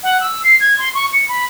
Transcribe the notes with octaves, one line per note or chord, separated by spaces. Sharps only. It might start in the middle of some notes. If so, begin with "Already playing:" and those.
F#5
E6
C7
G#6
C6
C#6
C#7
B5